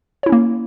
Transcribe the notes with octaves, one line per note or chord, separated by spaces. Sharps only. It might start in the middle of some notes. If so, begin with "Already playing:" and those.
A#3 C#4 E4 C#5